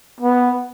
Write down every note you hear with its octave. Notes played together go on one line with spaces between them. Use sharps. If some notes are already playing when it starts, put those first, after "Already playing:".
B3